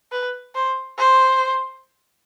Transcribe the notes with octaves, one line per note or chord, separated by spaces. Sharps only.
B4
C5
C5